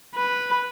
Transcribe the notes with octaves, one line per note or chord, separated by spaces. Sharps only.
B4